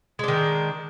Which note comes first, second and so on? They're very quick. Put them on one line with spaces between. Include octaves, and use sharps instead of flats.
G#3 D4 D#3